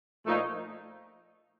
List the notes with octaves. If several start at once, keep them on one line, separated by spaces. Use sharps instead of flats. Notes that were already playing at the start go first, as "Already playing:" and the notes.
A#2 F3 A3 D#4